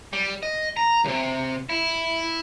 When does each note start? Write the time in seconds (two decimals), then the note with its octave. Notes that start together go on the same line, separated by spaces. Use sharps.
0.13 G3
0.43 D#5
0.77 A#5
1.05 C#2 C3
1.69 E4